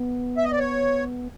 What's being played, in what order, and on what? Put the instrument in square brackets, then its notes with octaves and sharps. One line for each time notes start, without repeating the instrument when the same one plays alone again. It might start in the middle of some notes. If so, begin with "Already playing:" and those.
Already playing: [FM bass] B3
[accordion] E5
D#5
D5
C#5